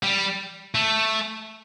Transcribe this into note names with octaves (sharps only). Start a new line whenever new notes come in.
G3
A3